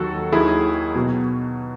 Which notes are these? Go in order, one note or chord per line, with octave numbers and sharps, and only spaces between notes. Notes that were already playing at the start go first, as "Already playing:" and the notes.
Already playing: D#2 D#3 F#3 F#4 A4
D#2 D#3 F#3 E4 G#4
B2 F#3